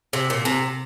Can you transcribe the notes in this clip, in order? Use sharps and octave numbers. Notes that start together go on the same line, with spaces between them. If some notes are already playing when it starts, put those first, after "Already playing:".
C3
A#2
C3